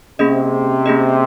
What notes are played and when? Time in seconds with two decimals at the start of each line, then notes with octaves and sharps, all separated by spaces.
0.19 C3 A#3 C#4 G#4 D#5
0.86 A#3 C#4 G#4 D#5